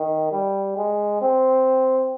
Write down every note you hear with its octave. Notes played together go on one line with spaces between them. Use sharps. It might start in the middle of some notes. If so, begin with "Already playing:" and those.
Already playing: D#3
G3
G#3
C4